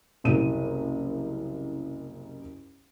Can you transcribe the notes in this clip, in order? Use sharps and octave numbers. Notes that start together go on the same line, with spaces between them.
F#1 C2 D#7